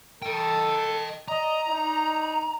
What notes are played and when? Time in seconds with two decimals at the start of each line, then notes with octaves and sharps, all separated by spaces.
0.22 A4 D#5 G5
1.28 D5 D#5 A#5
1.68 D4 D#4